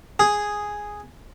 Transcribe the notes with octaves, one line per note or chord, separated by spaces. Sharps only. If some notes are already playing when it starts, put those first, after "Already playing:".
G#4